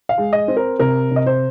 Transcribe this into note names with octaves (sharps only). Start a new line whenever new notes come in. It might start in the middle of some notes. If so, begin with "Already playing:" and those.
F5
G#3
D#5
C4
A#4
C3 A#4
C3
D#5
C5